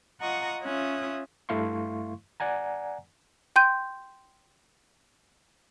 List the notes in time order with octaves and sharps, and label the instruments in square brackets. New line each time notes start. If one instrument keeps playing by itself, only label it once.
[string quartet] F4 D#5 F#5 A#5 C#6 D#6
C#4 F4 E5 D#6 F#6
[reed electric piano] G2 A3 E4 F5 C6 C#6
D5 F#5 G#5 A#5
[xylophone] G5 C6 G6 D#7